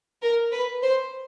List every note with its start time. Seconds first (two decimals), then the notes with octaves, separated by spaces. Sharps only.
0.22 A#4
0.52 B4
0.83 C5